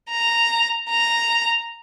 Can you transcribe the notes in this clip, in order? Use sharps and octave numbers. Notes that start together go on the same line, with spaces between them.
A#5
A#5